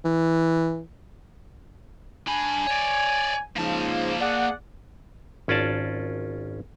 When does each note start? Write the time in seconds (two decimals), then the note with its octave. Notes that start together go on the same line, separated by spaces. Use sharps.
0.04 E3
2.28 D4 G#5 B5
2.67 C#5 D5
3.57 G#2 C#3 F3 A#3 A5
4.20 G#4 D5 F#5
5.48 G#1 C#4 F4 D5 A5